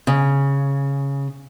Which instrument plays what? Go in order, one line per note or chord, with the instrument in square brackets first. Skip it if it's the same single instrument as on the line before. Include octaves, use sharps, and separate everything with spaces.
[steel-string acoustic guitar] C#3